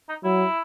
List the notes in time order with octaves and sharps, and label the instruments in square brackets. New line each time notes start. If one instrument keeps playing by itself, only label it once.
[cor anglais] D#4
[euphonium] F#3 [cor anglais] E4